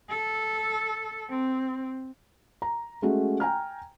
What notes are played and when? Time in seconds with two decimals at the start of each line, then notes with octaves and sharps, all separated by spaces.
0.10 A4
1.30 C4
2.62 A#5
3.02 G#3 A3 C#4 F#4
3.40 G5 G#5 A#5 F6